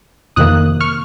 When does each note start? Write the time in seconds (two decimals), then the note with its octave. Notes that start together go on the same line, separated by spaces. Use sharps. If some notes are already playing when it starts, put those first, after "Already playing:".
0.36 F2 C3 D#3 A#3 D#6 F#6
0.81 C#6 F6